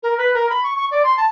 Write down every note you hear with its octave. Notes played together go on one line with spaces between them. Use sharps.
A#4
B4
A#4
B5
C#6
C#6
D5
C6
A5